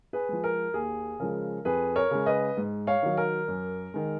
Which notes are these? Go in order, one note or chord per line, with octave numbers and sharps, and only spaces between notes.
G#4 B4
F3 G#3
A#4
D#2 G#4
C#3 F3 G#3 A#4
F2 G#4 B4
A#4 C#5
C#3 G#3
B4 D#5
G#2
C#5 F5
D#3 F#3
A#4
F#2
D#3 G#3